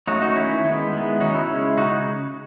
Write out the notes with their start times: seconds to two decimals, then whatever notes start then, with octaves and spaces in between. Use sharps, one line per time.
0.07 F#3 A3 C#4 D#4 F#4
0.22 D#4 F#4
0.36 D#3 A3 C#4 E4
0.64 D#3 G#3 B3 E4
0.93 D#3 G#3 B3
1.20 F#3 C#4 D#4 F#4
1.35 E4
1.49 C#3 G#3 C#4
1.77 C#3 G#3 D#4 F#4